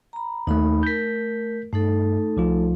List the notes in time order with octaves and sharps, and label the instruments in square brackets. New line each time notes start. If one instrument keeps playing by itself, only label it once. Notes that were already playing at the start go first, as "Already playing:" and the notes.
[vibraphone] A#5 B5
[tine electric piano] D#2 A3 [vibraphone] D#4 B5
[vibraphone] A3 A#4 [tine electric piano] G6 B6
[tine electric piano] G2 [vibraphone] A3 D#4 A4
[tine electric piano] C2 F3 F4